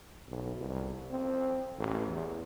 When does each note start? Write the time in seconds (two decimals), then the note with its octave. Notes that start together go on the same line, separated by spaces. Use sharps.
0.29 B1
0.59 C2
1.10 C4
1.78 A1
2.08 E2